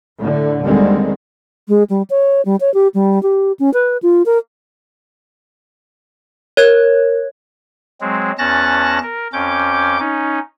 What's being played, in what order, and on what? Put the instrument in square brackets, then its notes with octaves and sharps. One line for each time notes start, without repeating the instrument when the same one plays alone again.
[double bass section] A2 D3
D#2 D3 D#3 G3 G#3 C4
[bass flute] G#3
G3
C#5
G3
C#5
G4
G3
G4
C#4
B4
F4
A#4
[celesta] A#4 [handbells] C#5 G#6
[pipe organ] F#3 G#3 C4
E2 C#4 A5 F#6 A6 A#6
A#4
F2 C#4 D6 G6
C#4 D#4